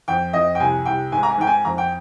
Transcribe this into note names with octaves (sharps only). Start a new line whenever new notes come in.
F2 G5
F2 D#5
G5
C2 G#5
C2 G5
G#2 G#5
A#5
G#5
G#2 G5
G#5
F2 A#5
G5